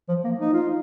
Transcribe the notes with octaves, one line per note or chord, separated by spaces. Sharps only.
F3
A#3
D#4
F4